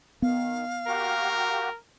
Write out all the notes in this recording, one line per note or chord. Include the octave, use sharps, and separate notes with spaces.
D#3 B3 F5
A#3 F#4 G4 A#4